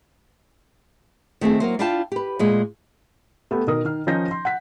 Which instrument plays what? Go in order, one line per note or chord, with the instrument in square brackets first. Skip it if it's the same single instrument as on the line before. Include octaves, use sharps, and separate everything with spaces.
[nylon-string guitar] D#3 A3 C4 G#4
F#3 A#3 C5
D4 E4 F4 F5 G5 A5
G4 B4
A#2 G#3
[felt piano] A3 B3 G4
B2 D#3 A#4 D#6
D#3 F6
D#3 F3 C#4 D#4 G6 A#6
C6
F#5 B6